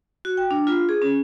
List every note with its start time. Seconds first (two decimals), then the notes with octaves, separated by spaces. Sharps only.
0.25 F#4
0.37 G5
0.51 D4
0.67 F4
0.89 G#4
1.02 C#4